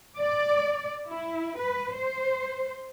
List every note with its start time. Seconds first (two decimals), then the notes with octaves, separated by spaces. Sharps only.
0.19 D5
1.07 E4
1.57 B4
1.94 C5